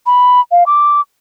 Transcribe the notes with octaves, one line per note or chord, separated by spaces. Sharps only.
B5
F5
D6